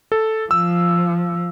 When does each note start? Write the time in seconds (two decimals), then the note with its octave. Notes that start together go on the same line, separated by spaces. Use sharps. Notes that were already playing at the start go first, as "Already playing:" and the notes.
0.12 A4
0.51 F3 E6